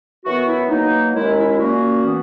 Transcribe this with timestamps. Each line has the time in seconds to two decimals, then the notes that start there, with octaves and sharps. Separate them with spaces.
0.24 F#2 E3 B3 F#4
0.47 E4
0.69 B2 F#3 A#3 D#4
1.14 D#2 D#3 G#3 C#4 E4
1.37 E4
1.50 E4
1.58 A#2 A#3 C#4 F#4
2.05 E3 B3